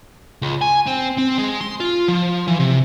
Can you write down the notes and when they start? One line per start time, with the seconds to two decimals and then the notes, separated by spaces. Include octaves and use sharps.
0.42 C#2
0.61 G#5
0.86 C4
1.17 C4
1.38 G#3
1.61 C6
1.80 F4
2.08 F3
2.48 E3
2.60 C3